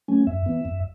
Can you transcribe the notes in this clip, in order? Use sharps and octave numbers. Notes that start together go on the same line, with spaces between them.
F#3 A3 C#4 G#5
F#2 E5
E3 B3
F#2